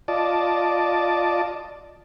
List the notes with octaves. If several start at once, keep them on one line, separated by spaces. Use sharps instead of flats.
F4 D5 D#5 A5